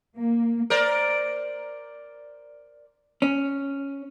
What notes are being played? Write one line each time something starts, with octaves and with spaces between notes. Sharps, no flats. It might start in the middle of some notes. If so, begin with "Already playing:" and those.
A#3
A#4 C5 D5
C#4